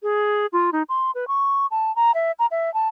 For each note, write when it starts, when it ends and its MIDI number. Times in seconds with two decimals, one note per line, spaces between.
0.03 0.47 68
0.53 0.70 65
0.72 0.83 63
0.89 1.11 84
1.15 1.28 71
1.28 1.67 85
1.71 1.94 81
1.96 2.12 82
2.14 2.32 76
2.39 2.46 82
2.51 2.73 76
2.74 2.88 81